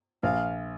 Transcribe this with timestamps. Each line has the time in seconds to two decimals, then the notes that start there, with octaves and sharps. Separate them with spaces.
0.23 A#1 F5